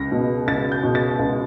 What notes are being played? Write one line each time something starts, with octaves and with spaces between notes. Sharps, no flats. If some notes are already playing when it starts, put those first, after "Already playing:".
Already playing: C#2 A#6
B2
C#2 A6
G6
B2
A6
C#2